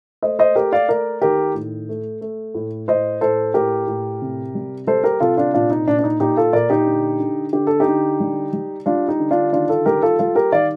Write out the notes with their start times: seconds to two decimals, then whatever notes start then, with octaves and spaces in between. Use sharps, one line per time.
0.23 A3 C5 D#5
0.39 C5 D#5
0.56 A3 G4 A#4
0.72 D5 F5
0.89 A3 A#4 D5
1.22 D#3 G4 A#4
1.55 A2
1.89 A3
2.21 A3
2.55 A2
2.88 A2 C5 D#5
3.21 A2 A4 C5
3.54 A2 G4 A#4
3.87 A2
4.22 C3
4.55 G3
4.87 G3 A4 C5
5.04 G4 A#4
5.20 C3 F4 A4
5.37 D4 F4
5.54 A#2 D4 F4
5.71 D#4
5.87 A#2 D4
5.99 D4
6.04 D#4
6.20 A#2 D#4 G4
6.37 F4 A4
6.53 A#2 A#4 D5
6.70 D#4 G4
6.87 D3
7.20 D3
7.53 D3 G4
7.67 A4
7.80 D#4 G4
7.87 D3
8.20 G3
8.53 G3
8.86 G3 D4 F4
9.08 D#4 G4
9.20 D3
9.31 D4 F4
9.53 D#3 D4 F4
9.69 F4 A4
9.86 G3 G4 A#4
10.02 F4 A4
10.19 G3 F4 A4
10.35 G4 A#4
10.52 D#3 D5 F5